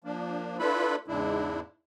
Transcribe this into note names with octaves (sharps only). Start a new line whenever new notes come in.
F3 A#3 D4
D4 E4 F4 A4 B4 B5
E2 G#2 C#3 G#3 D4 E4